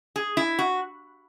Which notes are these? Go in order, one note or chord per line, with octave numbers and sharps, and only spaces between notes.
G#4
E4
F#4